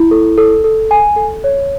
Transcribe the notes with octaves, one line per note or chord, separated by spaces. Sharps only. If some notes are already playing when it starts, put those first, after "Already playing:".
Already playing: E4
A4
A4
A4
G#5
A4
C#5